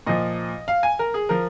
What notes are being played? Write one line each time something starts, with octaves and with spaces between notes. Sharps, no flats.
A#2 F3 D#5
F5
G#5
A#4
G#4
F3 A#4